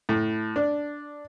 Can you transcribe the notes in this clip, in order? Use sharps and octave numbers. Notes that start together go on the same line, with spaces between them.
A2
D4